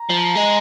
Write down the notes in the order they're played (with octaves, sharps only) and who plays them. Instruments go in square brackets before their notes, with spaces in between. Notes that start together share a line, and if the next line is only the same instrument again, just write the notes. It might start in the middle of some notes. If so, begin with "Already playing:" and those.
Already playing: [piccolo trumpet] A#5
[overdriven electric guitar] F3
G#3